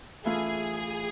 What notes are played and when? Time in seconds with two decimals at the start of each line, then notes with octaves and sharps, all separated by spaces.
0.25 E3 A3 C#4 F4 G#4